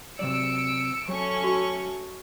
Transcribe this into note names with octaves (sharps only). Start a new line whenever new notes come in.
C3 F#3 D5 E6 C#7 D7
F#3 A3 C#4 C#6
F#4